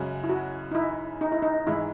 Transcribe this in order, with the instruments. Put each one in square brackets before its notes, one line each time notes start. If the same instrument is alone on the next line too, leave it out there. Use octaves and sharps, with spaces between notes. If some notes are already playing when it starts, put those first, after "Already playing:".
Already playing: [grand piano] F#2 C#3 G#3 [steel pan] F#4
[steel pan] E4
F#4
D#4
E4
D#4
E4
D#4
[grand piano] G#2 E3 G#3 D#4 [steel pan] E4